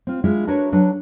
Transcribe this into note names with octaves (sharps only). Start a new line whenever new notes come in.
C4 F4
G#3 D4 E4 F4
D4 E4 F#4 A#4 B4 C#5
F#3 D4 A4 B4